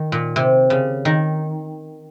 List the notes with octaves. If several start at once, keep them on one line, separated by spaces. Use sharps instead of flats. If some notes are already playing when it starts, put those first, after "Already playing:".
Already playing: D#3
A#2
C3
C#3
D#3